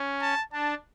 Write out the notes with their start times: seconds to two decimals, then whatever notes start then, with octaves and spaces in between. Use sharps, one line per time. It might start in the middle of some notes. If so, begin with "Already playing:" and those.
Already playing: C#4
0.22 A5
0.53 D4 A5